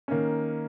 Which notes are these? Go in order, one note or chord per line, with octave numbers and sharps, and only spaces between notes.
D#3 A#3 C#4